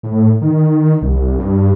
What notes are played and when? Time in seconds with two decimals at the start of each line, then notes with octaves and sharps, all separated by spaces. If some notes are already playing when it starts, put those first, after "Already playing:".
0.03 A2
0.41 D#3
1.02 C2
1.39 G2